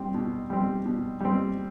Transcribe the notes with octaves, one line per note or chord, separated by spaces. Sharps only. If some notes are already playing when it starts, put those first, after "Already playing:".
Already playing: G3 C4
B2
G3 C4
B2
G3 C4